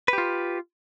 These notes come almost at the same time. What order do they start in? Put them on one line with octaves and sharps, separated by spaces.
B4 G4 F4